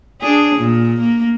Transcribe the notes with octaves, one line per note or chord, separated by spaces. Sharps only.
D4 G#4
A#2
A#3